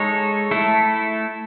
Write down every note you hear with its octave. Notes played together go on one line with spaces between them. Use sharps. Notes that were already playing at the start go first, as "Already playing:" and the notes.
Already playing: G#3 D#4 A4 C#5
A3 E4 A4